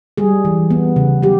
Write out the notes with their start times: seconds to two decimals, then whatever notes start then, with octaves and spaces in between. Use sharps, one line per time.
0.18 G3 G#4
0.45 E3
0.71 B3
0.96 C#3
1.23 F#3 G4